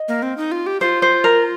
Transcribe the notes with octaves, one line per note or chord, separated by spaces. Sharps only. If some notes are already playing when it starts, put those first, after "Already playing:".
Already playing: D#5
A#3
C4
D#4
F4
G4
F4 C5
C5
A#4